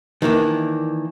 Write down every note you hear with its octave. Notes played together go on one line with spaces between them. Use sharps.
D#3 E3 A#3 D4